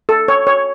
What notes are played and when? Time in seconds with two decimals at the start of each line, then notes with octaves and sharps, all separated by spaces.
0.09 A4
0.28 C#5
0.47 C#5